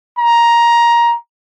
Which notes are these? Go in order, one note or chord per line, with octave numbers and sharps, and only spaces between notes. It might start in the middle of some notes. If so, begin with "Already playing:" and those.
A#5